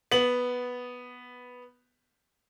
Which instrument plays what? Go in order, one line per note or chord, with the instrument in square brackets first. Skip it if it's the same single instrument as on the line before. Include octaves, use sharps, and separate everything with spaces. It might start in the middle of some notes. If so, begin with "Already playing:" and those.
[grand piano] B3 F#7